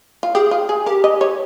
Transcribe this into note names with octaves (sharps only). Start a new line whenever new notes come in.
F4
G4 G#4
F4
G#4
G4 A#4
D#5
C#5